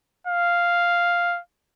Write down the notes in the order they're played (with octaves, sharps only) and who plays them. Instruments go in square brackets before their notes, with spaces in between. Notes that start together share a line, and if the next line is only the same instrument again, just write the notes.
[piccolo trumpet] F5